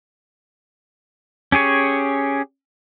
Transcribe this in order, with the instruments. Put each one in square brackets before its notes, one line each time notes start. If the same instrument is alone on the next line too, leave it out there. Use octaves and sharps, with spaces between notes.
[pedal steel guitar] C#4 G4 G#4 C#5